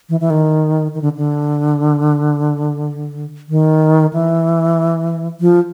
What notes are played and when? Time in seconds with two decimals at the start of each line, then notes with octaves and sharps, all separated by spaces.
0.09 E3
0.20 E3
0.30 D#3
0.94 D#3
1.02 D3
1.16 D3
3.49 D#3
4.13 E3
5.41 F3